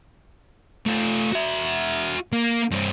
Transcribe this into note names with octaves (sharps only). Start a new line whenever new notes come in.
A3 F4
F#4 E5
A#3
G2 C4